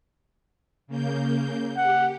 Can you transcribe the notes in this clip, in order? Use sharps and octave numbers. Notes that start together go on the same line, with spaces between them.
C#3 A#3 G6
G4 F#5